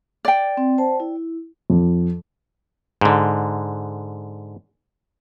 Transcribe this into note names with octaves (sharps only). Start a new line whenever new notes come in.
D5 G5
C4
C5 A5
E4
F2
G#2 D3